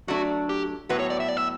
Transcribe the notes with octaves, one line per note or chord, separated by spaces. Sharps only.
F#3 A3 D4 F#4
G4
A2 F#3 B3 F#4 B4
C#5
D5
E5
D5
E5